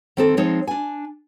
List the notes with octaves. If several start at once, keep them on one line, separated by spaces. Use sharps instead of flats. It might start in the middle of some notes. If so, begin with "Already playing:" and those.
D#3 C4 A4
F3 G#3 C4 D#4 C5 C#5
D4 G#5